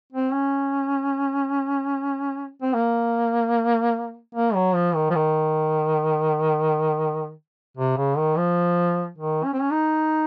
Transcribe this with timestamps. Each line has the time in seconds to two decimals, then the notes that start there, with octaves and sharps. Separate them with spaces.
0.12 C4
0.32 C#4
2.62 C4
2.74 A#3
4.35 A#3
4.55 F#3
4.75 F3
4.95 D#3
5.10 F3
5.15 D#3
7.77 C3
7.97 C#3
8.17 D#3
8.38 F3
9.18 D#3
9.45 C#4
9.53 C4
9.61 C#4
9.72 D#4